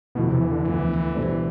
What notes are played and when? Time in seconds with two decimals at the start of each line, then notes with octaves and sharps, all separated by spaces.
0.15 E2 B2 D3 F3 B3 E4
0.28 C3
0.40 E3
0.52 D3
0.64 D2 D3 E3 F3 B3
1.13 B2 G3 D4 A4 C5